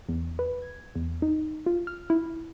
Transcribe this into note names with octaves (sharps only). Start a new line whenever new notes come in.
E2
B4
G#6
E2
D#4
F4
F6
E4